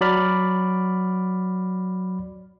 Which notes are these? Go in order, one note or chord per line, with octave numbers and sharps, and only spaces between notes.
F#3 D5 B5 F6